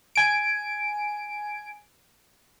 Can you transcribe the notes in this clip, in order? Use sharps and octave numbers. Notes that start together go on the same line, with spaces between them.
G#5 D7